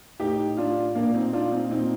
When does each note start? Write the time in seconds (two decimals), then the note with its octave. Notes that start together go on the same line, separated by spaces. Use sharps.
0.20 A2 D#4 G4
0.57 A2 D4 F4
0.95 A#2 A#3 D4
1.14 C4 D#4
1.33 A#2 D4 F4
1.52 C4 D#4
1.71 A#2 C4 D#4